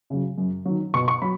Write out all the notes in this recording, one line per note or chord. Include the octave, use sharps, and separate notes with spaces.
C#3 F#3
F#2
D#3 F#3
B2 C#6
C#6
F#3 B5